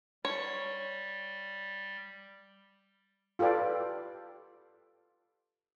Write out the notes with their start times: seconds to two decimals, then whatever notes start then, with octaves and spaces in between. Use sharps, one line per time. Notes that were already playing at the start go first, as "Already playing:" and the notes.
0.25 G3 C#5
3.39 F4 G4 A4 B4 D5